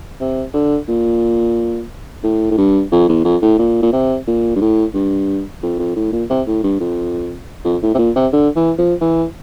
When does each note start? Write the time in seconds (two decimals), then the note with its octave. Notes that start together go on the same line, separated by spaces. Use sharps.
0.20 C3
0.54 D3
0.88 A#2
2.24 A2
2.51 A2
2.58 G2
2.92 F2
3.09 E2
3.25 F2
3.42 A2
3.58 A#2
3.82 A#2
3.93 C3
4.27 A#2
4.56 G2
4.61 A2
4.94 G2
5.63 F2
5.79 F2
5.96 A2
6.12 A#2
6.30 C3
6.47 A2
6.63 G2
6.80 F2
7.65 F2
7.82 A2
7.94 C3
7.98 A#2
8.16 C3
8.33 D3
8.56 E3
8.79 F3
9.01 E3